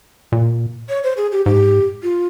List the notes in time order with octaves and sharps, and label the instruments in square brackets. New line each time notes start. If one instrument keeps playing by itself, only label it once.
[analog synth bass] A#2
[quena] C#5
C5
G#4
G4
[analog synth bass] G#2 [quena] G4
[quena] F4